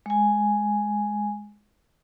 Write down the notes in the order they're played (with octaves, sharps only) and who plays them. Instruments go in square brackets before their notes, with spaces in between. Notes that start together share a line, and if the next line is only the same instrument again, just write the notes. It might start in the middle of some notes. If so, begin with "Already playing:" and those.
[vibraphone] G#3 G#5